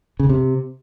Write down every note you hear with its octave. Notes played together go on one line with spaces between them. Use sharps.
C#3
C3